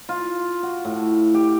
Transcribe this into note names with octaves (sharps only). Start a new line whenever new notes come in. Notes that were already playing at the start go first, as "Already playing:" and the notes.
F4
F#4
A2
G4